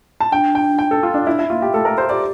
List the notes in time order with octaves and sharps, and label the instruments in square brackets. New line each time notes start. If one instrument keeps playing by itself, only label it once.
[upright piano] A5
[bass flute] D4 [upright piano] G5
[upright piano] G5
G5
A4
F4
D4
[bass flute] D4 [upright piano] E4
[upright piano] E4
[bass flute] A#3 [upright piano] F4
[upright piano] G4
[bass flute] A3 [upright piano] A4
[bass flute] A3 [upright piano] A#4
[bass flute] G4 [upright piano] C5
[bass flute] G4 [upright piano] D5